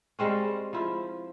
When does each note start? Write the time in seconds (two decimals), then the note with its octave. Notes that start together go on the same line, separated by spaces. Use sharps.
0.19 G3 G#3 C4 C#4
0.73 F3 E4 F4